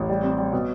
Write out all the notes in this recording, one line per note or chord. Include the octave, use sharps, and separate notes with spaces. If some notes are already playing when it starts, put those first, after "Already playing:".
Already playing: A1
G3
C4
G3
B2